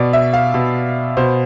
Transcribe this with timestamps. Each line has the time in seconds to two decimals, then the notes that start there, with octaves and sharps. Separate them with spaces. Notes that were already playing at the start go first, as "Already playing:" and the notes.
Already playing: B2 D5
0.13 E5
0.33 F5
0.54 B2
1.17 B2 C5